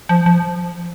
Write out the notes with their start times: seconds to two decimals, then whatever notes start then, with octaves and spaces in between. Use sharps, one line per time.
0.09 F3
0.26 F3